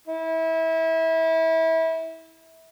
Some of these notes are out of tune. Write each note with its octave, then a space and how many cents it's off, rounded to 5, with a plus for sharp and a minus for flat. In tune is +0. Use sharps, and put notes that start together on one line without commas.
E4 -25